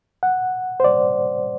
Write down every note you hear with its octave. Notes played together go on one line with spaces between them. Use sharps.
F#5
C5
D5